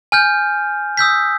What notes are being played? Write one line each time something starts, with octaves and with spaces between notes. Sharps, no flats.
G#5 F6 G6
D#6 E6 G6 B6